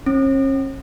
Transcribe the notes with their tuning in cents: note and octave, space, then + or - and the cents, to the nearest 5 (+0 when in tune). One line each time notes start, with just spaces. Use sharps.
C#4 -45